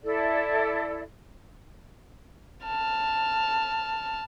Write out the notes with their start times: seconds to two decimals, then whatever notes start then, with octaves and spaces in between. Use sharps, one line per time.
0.04 E4 A4 D5
2.65 A5 F6